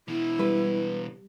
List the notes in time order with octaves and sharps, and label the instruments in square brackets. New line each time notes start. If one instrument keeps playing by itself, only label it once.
[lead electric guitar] B2 E3 [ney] E4
[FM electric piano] G3 [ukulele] B4